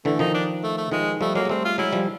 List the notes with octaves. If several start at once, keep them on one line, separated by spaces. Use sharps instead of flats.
D3 E3 A3
D#3 F3 D#4
D4
A3
A3
D#3 F3 G#3
F3 G3 A3
F#3 G#3 A#3
G#3
G3 A3 C4
F4
F#3 G#3 E4
F3 G3